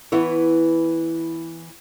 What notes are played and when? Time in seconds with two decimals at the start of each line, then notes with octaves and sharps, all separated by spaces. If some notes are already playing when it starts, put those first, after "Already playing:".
0.12 E3 B3 E4 C#5